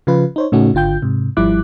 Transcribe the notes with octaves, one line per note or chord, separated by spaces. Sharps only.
C#3 F3 F4 B4
D#4 C5 C#5
A2 C#3 A3 C#4 D#4 F#4
G#1 D3 F4 G5 G6
G#2 C3
G#1 F3 G3 E4 D6 F#6